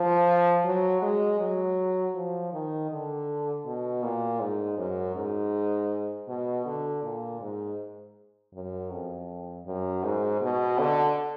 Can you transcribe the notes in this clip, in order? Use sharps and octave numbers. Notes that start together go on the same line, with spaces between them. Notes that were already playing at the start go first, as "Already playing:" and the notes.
Already playing: F3
F#3
G#3
F#3
F3
D#3
D3
B2
A#2
G#2
F#2
G#2
B2
D3
A#2
G#2
F#2
F2
F#2
G#2
B2
D3